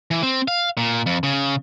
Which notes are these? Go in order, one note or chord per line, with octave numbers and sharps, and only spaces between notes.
E3
C4
F5
A#2
F2
C#3